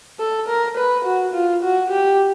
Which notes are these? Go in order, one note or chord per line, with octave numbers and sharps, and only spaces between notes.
A4
A#4
B4
F#4
F4
F#4
G4